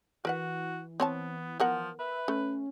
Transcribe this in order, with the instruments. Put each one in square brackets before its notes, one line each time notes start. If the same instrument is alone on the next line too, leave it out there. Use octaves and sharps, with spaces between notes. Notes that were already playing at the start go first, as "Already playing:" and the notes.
[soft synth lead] E3 [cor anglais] F#4 [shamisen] A#4 B4 F#5
[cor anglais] B3 [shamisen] C4 C#5 A5
[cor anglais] F3 [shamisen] B3 A#4 F#5
[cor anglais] B4 [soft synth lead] E5
[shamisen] A3 [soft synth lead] C#4